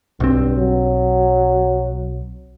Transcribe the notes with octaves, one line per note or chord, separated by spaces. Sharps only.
B1 G2 C4
F#3